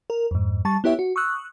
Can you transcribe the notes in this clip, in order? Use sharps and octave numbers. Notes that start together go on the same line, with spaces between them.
A#4
F2 G#2
G3 A5 C#6 A6
B3 E4 G4 C#5 E5
F#4
C#6 D#6 E6 F#6